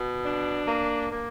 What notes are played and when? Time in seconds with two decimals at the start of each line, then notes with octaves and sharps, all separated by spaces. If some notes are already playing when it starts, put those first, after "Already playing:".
Already playing: B2
0.25 D4
0.68 A#3
1.12 A#3